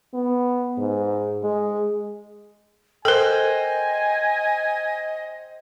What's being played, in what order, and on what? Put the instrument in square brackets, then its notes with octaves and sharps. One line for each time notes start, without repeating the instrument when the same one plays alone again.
[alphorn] B3
G#2
G#3
[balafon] A4 A#4 [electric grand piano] C5 G5 [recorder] D#5 [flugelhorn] G#5